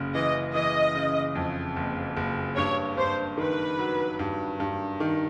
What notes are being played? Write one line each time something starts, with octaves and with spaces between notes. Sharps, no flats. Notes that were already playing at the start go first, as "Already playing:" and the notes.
Already playing: F#1 C#3
E3 D#5
E3 D#5
C#3
F2
F#1
F#1
G2 C#5
G2 C5
D#3 B4
F#3
G2
G2
D#3